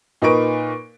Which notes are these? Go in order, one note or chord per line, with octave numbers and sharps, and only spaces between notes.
A#2 D#4 A#4 B4 C#6 D7